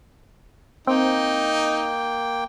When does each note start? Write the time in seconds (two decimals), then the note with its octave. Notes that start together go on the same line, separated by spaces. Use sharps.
0.87 A#3 C4 D#4 G5